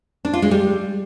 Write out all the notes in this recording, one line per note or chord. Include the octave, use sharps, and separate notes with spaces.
D4
F4
G#3
G3